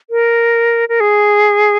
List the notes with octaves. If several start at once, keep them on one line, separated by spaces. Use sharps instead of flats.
A#4
A#4
G#4